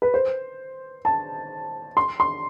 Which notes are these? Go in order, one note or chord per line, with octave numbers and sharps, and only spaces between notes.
B4
C5
A5
C6
C6